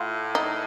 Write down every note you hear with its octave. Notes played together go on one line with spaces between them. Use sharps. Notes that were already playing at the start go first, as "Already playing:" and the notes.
Already playing: A2 F4
D#4